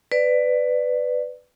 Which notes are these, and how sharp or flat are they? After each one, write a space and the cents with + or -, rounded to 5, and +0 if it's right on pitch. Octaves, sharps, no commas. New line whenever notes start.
B4 +15 D5 +10